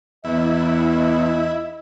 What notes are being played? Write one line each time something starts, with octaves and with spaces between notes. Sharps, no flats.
E2 E4 D#5